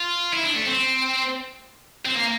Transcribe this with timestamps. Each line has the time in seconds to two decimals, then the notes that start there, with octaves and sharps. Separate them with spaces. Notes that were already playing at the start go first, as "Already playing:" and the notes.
Already playing: F4
0.34 E4
0.44 D4
0.55 A3
0.66 C4
2.05 C4
2.15 A#3